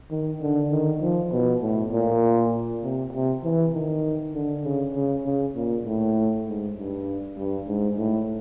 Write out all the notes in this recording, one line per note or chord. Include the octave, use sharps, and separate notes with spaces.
D#3
D3
D#3
F3
B2
A2
A#2
C3
C3
E3
D#3
D3
C#3
C#3
C#3
A#2
A2
G#2
G2
G2
G#2
A2